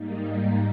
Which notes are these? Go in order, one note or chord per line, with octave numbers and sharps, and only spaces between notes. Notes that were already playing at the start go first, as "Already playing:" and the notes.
Already playing: G#2 G3 A#3 D#4